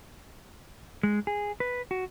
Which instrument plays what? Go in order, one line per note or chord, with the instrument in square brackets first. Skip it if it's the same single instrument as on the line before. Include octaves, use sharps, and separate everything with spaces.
[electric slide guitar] G#3
G#4
B4
F#4